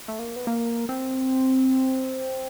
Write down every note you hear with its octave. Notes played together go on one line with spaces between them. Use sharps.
A3
A#3
B3
A#3
C4